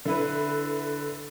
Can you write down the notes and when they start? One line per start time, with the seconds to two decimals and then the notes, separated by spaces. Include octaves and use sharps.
0.05 D3 E4 B4